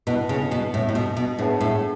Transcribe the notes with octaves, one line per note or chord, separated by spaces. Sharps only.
B2 E4 B4 F#5 A5
C#3
B2
A2
A2
B2
B2
A2 D4 G#4 B4 F#5 A5
A2